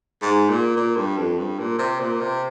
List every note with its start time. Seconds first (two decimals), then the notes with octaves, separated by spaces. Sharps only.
0.22 G#2
0.49 A#2
0.77 A#2
0.97 G2
1.17 F2
1.38 G2
1.59 A#2
1.78 C3
2.00 A#2
2.20 C3